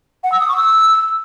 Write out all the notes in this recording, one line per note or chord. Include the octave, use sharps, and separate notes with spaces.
F#5
E6
D#6
C#6
E6